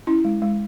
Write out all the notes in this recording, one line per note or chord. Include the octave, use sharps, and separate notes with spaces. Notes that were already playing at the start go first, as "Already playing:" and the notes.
C#4 E4
G#3
G#3